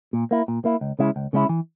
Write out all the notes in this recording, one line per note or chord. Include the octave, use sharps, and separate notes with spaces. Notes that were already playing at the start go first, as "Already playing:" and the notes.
A#2
A#3 E4
A#2
A#3 E4
C#2
C#3 G#3 C#4 E4
C#2
C#3 G#3 C#4 E4
E3